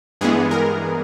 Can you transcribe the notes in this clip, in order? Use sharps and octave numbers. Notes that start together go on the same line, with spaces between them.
G2 E3 G#3 B3 G#4
A#4